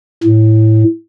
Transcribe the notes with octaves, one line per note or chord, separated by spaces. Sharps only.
A2